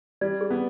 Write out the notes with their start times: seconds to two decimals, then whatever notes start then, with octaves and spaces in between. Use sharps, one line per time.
0.21 G3 D5
0.41 G#4
0.50 B3